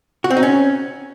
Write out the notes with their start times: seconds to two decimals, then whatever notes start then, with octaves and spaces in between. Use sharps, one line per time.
0.24 F#4
0.30 C4
0.37 D#4
0.43 C#4